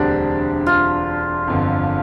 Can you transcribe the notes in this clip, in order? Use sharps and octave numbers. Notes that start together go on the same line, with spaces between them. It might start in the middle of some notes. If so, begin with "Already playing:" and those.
Already playing: E1 D2 D3 G3 C4 D4
F4
G1 F2 D3